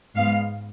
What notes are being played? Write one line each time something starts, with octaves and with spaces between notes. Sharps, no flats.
G#2 G#3 B3 F5